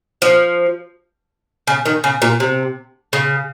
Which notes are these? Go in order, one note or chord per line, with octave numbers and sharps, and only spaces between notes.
F3
C#3
D#3
C#3
A#2
C3
C#3